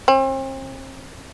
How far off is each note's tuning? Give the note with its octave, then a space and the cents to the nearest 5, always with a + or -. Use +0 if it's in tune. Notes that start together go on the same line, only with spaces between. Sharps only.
C4 +40